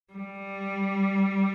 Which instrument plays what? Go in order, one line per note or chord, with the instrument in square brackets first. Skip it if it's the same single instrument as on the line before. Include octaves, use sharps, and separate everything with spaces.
[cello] G3